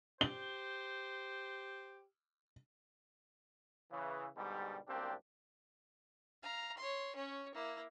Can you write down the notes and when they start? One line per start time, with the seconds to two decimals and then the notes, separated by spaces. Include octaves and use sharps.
0.21 G4 C5 G7
3.91 C#3 E3
4.37 G#2 B2 D3 G3
4.88 C2 F#2 A#3 C4 D4 G4
6.43 F5 A#5
6.78 C#5 C6
7.16 C#4 C#5
7.55 A#3 E4